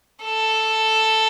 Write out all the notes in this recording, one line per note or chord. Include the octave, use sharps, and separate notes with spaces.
A4